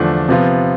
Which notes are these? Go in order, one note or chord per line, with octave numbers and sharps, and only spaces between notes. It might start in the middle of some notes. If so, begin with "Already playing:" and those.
Already playing: E2 D3 F3 A3 D4
C3 F3 B3 F4